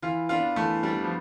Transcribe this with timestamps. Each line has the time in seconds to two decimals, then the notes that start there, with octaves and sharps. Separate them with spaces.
0.02 E3 F4
0.29 B3 D4 F4
0.56 E3 A3
0.83 G3 B3 D4
1.04 F3